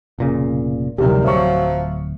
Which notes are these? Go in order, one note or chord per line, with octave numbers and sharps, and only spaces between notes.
F1 A#2 C#3
D1 F2 A2 C3 D#3 G3
F3 F#3 E5 F5 C#6